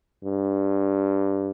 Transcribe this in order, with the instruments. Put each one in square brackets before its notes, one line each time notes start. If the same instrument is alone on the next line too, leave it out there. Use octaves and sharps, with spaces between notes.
[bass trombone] G2